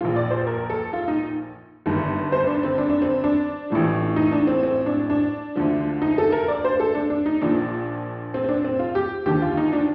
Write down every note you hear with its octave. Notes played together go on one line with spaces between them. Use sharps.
A#1 A#2 F3 F4
D5
C5
A#4
A4
F4
D#4
G1 G2 D#3
C5
D4
C4
D4
D4
C4
D4
A1 A2 F3
D#4
D4
C4
C4
D4
D4
D2 D3 F3
D#4
A4
A#4
D5
C5
A4
D4
D4
D#4
A#1 A#2 F3 D4
C4
C4
D4
C4
F4
G4
D#2 D3 F3 G4
F4
D#4
D4